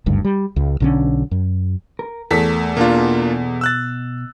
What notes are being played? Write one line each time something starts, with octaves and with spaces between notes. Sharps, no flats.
F#1 D2 G2
G3
C#2
B1 D3 C#4
F#2
A#4
E2 A3 A4 A#4 B6
B2 A#3 D4 F4
E6 F#6 A6